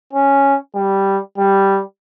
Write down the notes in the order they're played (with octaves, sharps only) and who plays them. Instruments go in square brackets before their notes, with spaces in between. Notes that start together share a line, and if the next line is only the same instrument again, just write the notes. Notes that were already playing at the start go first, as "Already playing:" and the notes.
[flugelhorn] C#4
G3
G3